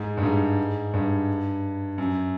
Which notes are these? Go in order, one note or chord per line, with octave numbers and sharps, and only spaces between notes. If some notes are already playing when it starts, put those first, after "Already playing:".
Already playing: G#2
G2
G#2
G2
F#2